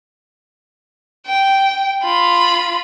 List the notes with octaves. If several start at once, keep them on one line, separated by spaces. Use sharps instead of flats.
G5
F4 B5